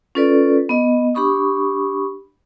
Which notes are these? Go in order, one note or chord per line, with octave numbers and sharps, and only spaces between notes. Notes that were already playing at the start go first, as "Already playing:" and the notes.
C#4 F4 A4 B4 D5
B3 D#5
D4 G4 B5 C#6 D#6